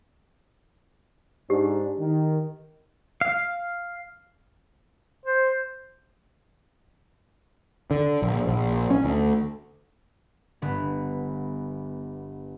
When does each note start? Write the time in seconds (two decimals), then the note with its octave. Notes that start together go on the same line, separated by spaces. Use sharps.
1.50 G#2 D4 G4
2.00 D#3
3.21 F5
5.26 C5
7.91 D3
8.22 A#1
8.47 A#1
8.90 C#4
9.05 D2
10.62 G1 B3